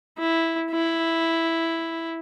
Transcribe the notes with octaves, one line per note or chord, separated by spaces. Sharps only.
E4
E4